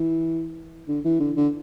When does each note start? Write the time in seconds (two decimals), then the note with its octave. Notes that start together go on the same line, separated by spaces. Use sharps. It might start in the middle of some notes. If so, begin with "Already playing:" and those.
Already playing: E3
0.88 D3
1.05 E3
1.20 D3
1.37 D3